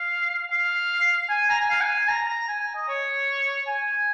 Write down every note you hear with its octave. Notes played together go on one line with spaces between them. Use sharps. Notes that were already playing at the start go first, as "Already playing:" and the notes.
Already playing: F5
F5
G#5
A#5
G#5
F5
G#5
A#5
A#5
G#5
G#5
D#5
C#5
G#5